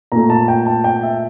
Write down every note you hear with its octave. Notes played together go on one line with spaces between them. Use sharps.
A#2 A3 A#5
A5
G5
A5
G5
E5